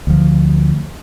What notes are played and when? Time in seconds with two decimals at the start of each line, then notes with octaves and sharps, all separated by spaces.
0.07 D2 F3